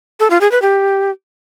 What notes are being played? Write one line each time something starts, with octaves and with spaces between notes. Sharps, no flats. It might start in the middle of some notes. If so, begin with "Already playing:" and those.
A4
F4
G#4
B4
G4